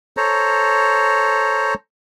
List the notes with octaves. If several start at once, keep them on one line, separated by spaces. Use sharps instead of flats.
A4 C5 C#5 A#5